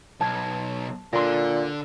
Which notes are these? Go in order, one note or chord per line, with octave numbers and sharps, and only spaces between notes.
B1 A5 G#6
A#2 D3 C6 A#6